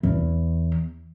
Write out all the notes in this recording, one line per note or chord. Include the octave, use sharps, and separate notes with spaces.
E2